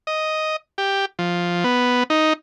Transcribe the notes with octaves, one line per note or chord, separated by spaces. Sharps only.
D#5
G4
F3
B3
D#4